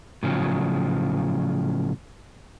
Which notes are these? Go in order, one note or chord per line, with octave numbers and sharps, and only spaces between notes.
A2 C#3 F3 F#3